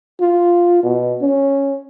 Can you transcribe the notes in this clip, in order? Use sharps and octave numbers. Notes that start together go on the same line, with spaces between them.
F4
B2
C#4